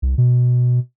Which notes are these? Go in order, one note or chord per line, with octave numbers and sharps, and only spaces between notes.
C2
B2